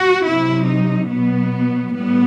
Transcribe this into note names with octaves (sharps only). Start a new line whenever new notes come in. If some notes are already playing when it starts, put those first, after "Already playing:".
Already playing: F#4
C3 F#3 E4
D#4
B2 F#3 B3
A2 G3 B3